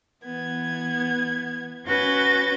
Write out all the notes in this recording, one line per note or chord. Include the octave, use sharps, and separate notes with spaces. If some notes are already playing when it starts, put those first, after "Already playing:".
E3 B3 G#6
C#4 F#4 B4 G6 A6